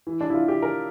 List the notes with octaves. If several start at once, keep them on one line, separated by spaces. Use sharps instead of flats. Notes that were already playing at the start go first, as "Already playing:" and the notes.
E3
D4
E4
F4
G4
A#4